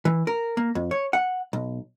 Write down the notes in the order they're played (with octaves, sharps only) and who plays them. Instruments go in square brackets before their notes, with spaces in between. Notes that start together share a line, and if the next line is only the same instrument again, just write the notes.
[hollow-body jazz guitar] E3
A#4
A#3
F2
C#5
F#5
B1